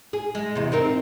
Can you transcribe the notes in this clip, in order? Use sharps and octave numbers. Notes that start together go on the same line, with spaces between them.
G#4
G#3
E2 C3
C4 D#4 A#4